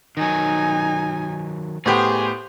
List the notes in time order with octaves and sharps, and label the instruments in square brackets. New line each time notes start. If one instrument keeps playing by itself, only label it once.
[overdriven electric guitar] D#3 F#3 [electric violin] D#4 G#5
[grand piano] A2 B3 G4 [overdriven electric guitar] G#4 [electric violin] C5